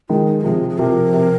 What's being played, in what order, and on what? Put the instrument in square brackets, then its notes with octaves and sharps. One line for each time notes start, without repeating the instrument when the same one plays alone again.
[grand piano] D#3 G#3 [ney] F4
[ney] D#4
A#4
[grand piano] C3 F3 [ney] G#4
[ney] G#4
[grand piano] C3 F3 [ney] A#4
[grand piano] C3